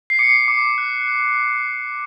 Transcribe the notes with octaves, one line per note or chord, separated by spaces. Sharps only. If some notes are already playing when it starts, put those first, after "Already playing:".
C7
D6 C#7
D6
F#6
F#6